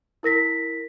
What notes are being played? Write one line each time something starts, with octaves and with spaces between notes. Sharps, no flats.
E4 A#4 A#6 B6